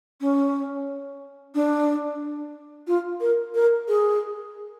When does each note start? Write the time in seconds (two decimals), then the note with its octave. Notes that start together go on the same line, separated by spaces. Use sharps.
0.21 C#4
1.55 D4
2.87 F4
3.21 A#4
3.55 A#4
3.88 G#4